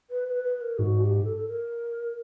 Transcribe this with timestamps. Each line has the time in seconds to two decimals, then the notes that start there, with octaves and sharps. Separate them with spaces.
0.10 B4
0.28 B4
0.44 B4
0.61 A#4
0.78 G#2 F#4
1.02 G4
1.24 A4
1.36 A4
1.47 A#4